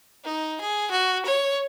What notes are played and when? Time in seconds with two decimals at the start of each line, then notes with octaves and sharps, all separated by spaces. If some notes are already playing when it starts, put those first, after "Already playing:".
0.25 D#4
0.61 G#4
0.91 F#4
1.26 C#5